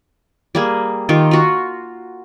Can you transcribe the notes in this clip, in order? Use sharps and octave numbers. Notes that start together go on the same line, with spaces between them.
G3 A#3 G#4
D#3 F4 G4
F4 F#4